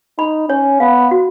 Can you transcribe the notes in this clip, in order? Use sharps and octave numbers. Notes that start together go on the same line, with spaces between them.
D#4 B5
C#4 C#5
B3 F5
F#4